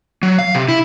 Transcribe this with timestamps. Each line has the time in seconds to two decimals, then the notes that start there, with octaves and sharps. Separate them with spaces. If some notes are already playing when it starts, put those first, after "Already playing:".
0.23 F#3
0.38 F5
0.55 C3
0.68 E4